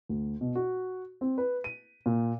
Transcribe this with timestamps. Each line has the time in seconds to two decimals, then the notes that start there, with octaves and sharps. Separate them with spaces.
0.09 D2
0.41 B2
0.56 F#4
1.21 C4
1.38 B4
1.64 D#7
2.06 A#2